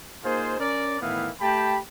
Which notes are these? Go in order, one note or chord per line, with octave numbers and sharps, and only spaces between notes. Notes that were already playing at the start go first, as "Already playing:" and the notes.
A#3 D#4 F4 G#4 C5
C#4 A#4 D5
A2 D#3 E3 B3 E4 F5
A3 G4 G5 A5 B5